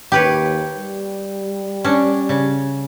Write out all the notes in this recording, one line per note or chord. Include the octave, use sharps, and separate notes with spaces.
D#2 G4 B4 C#5
G3
C#4 D4
C#3